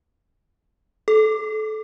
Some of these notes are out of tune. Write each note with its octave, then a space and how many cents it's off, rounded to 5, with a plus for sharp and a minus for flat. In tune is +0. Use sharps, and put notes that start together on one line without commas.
A4 -25